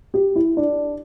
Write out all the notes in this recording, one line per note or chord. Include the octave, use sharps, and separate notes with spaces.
G4
E4
D4